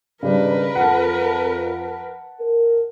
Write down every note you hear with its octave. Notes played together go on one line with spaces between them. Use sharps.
G#1 C#3 G3 D4 A#4 B4
F2 F#5 A5
A#4